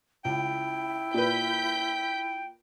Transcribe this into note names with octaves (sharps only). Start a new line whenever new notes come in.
C#2 E4 G5
A#2 B4 G6 B6